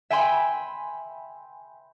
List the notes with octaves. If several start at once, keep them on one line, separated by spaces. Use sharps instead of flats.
E5 G5 G#5 B5 C6